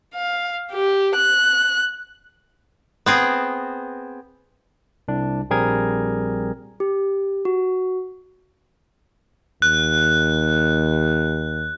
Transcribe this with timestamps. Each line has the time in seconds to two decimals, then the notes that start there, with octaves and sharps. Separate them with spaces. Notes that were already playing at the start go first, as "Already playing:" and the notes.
0.15 F5
0.72 G4
1.15 F#6
3.06 B3 C4 G#4
5.08 C2 D4
5.50 A#1 G3 C4 G#4 A#4 G#6
6.80 G4
7.45 F#4
9.62 D#2 F#6